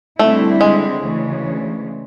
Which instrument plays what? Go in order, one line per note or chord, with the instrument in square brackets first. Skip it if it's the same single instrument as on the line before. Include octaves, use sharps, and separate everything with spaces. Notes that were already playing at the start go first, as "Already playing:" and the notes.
[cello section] D3 G3 C4 E4 [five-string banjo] A3
[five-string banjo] G#3
[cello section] D2 C#3 E3